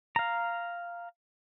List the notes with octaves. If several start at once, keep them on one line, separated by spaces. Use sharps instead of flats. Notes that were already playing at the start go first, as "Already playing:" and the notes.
F5 A#5